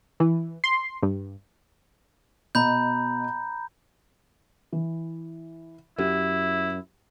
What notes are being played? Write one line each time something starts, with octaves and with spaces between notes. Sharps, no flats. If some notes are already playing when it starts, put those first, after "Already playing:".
E3
C6
G2
B2 D#5 A#5 B5 G6
E3
F#2 E4 G4